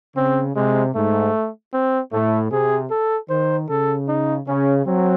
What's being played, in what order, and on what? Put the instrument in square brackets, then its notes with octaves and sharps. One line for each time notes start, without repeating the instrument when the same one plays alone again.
[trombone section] C#3 [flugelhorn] C4
[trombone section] C3 [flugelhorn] G#3
[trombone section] G#2 [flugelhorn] A3
[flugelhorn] C4
[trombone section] A2 [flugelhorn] A3
[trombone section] C3 [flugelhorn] G#4
[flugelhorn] A4
[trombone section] D#3 [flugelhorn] C5
[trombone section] C#3 [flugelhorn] A4
[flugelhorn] D#4
[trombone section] C#3 [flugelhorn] C#4
[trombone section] F#3 [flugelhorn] C4